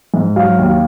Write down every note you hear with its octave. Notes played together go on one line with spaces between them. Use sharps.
G#2
F#3 F5
D#2